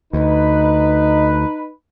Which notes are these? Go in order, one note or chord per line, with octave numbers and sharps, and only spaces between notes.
D2 D#4 B4